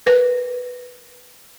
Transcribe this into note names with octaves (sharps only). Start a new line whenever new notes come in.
A#4 B4